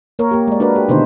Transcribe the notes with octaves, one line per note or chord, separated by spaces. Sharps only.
A#3 A#4 C#5
A#3 G4
G#3 D5
D4 F#4 G#4 A#4 B4
G4
B2 D3 D#3 D#4 E4 C5